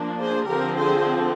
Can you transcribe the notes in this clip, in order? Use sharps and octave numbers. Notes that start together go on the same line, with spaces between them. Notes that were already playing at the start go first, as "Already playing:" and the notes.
Already playing: F3 A#3 D4
G#4 C5
D3 F3 C4 G4 A#4
G#4 C5